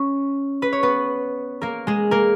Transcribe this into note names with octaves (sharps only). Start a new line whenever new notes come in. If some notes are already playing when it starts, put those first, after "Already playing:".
Already playing: C#4 C#5
B4
C#5
B3 B4
A#3 A#4
G#3 G#4
A#3 A#4